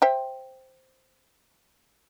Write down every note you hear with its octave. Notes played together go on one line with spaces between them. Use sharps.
C5 E5 G5